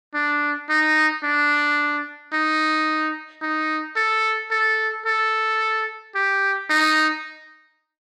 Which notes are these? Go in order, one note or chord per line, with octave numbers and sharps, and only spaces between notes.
D4
D#4
D4
D#4
D#4
A4
A4
A4
G4
D#4